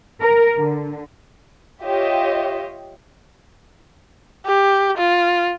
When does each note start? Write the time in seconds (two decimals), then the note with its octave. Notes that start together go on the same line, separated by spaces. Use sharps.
0.21 A#4
0.57 D3
1.82 F4 G4 C#5 D#5 E5
4.45 G4
4.98 F4